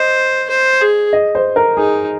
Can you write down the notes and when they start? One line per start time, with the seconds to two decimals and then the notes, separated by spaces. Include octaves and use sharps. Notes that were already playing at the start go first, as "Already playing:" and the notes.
Already playing: C5 D#5
0.50 C5
0.81 G#4
1.13 D#5
1.35 C5
1.56 A#4
1.77 D#4 G#4